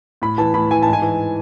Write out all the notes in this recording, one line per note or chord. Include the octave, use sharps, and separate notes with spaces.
A2 B5
E3 A5
A2 B5
E3 G#5
G#2 A5
G#5
E3